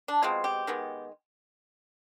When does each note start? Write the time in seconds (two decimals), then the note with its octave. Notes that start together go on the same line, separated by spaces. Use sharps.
0.08 D4
0.23 B2 G#3 C4 F4
0.44 G4
0.67 D#3 G#3 B3